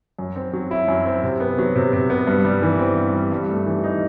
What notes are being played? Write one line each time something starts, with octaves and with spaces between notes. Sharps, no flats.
F#2
C4
F#3
E4
F#2
C4
C3
B3
F#3
C3
C3
B3
G2
G3
E3
C4
G2
G3
G2
A3
E3
D#4